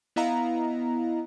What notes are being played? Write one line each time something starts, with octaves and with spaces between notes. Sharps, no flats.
B3 E4 D#5 F5 A#5